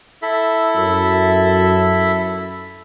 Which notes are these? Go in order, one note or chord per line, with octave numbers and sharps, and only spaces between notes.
E4 A4 E5
F#2